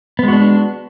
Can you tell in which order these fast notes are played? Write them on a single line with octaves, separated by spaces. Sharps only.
B3 G#3 F#4 D4